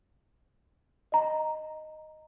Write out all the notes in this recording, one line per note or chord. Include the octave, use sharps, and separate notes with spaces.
D#5 A#5